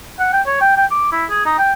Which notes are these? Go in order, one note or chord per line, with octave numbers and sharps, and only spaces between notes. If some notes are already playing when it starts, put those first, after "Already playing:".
F#5
G5
C#5
G5
G5
D6
E4
G#4
D#4
G5